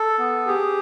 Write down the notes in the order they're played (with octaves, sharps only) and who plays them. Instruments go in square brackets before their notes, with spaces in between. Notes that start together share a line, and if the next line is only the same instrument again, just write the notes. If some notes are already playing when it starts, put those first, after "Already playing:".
Already playing: [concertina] A4
B3
G4 G#4